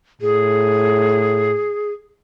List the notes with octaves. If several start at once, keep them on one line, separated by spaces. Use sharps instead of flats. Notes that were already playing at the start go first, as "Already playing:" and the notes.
A2 G#4